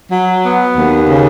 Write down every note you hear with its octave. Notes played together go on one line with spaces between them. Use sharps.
F#3
B3
D#2
C#3